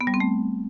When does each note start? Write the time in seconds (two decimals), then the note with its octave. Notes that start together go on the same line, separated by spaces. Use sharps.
0.01 B3
0.07 G3
0.14 C4
0.20 A3